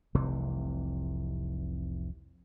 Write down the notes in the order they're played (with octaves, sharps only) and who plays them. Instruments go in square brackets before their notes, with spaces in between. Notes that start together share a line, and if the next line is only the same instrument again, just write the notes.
[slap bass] F1 C2 C3 E3